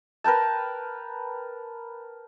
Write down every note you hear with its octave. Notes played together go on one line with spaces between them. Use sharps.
A#4 B4 G5 A5